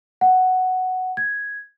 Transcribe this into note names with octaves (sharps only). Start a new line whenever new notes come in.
F#5
G#6